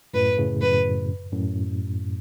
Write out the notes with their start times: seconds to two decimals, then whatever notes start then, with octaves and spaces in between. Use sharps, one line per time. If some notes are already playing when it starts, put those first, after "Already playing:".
0.14 F#2 A2 B4
0.37 A2 C#3
0.62 F#2 B4
1.32 F#2 A2